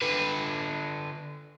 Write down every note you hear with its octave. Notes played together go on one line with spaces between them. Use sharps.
D3 B4